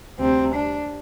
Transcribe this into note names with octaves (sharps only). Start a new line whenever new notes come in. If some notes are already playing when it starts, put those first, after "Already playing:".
D2 C3 G3 C4
D4